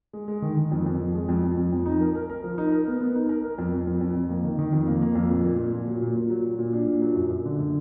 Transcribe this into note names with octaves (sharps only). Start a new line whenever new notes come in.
G#3
G#3
D#3
D#3
F2
F2
F2
G#3
F2
F2
F2
F2
D#4
A#4
A#4
A#4
F3
D#4
A#4
B3
B3
D#4
A#4
A#4
F2
F2
F2
F2
F2
A#3
D#3
D#3
F2
A#3
A#3
F2
A#2
A#2
A#2
A#2
F#3
A#2
A#2
F#3
F#3
A#2
D4
A#2
F#3
F#2
F#2
D3
D3